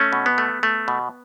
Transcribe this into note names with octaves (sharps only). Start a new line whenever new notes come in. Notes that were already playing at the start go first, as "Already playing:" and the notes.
Already playing: A3 C#4
B2
B3
A3
A3
B2